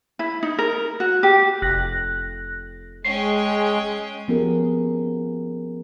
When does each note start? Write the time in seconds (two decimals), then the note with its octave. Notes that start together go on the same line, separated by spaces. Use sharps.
0.19 E4
0.43 D#4
0.59 A#4
1.00 F#4
1.23 G4
1.62 F1 F#6 A#6
3.05 G#3 C#4 G5 C7
4.28 F3 B3 C#4 G4 G#4 A#4